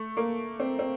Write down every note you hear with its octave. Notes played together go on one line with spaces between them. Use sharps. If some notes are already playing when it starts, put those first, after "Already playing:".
Already playing: A3
A#3
C4
C4